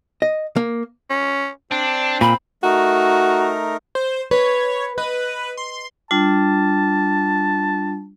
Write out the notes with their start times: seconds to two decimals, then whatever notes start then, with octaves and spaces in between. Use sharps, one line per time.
0.22 D#5
0.56 A#3
1.10 C#4
1.71 C4 D4
2.21 A#2 B5
2.63 A3 D#4 F#4 A#4
3.95 C5
4.31 B4 C#5
4.98 B4 D#5
5.57 C6
6.11 G3 D4 F4 A5